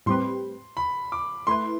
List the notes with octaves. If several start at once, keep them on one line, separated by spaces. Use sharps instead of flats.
A2 G3 C4 G4 B4 C6
B5
D6
A3 E4 B4 C6